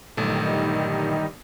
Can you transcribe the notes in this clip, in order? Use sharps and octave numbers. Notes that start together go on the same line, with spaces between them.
G1 A#2 D3 D#3 F#3 G3 A3 D#4